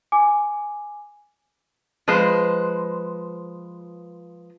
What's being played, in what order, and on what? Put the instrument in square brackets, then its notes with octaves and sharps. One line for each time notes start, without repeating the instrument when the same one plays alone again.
[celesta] G#5 D6
[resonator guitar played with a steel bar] F3 G#3 B4 C5